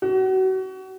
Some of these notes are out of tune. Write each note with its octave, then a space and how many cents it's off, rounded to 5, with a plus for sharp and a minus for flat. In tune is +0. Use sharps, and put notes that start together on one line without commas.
F#4 +30